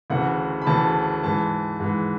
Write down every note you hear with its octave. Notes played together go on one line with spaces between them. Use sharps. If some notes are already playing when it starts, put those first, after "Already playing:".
D2 C#3 E3 F#5
B5
D2 C#3 E3 A5
G#2 E3 A5
G#2 E3